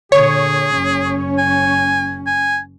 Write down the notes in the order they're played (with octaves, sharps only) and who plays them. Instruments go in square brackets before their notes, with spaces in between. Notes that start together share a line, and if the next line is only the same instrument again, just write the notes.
[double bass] A#2 D3 [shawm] G#4 [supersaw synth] C#5
[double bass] F#1 C#4
[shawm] G#5
G#5